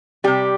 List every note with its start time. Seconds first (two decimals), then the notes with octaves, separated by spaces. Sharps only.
0.24 C3 G3 G4